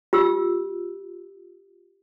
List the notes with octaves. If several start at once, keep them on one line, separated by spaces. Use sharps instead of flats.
F4 G4 E6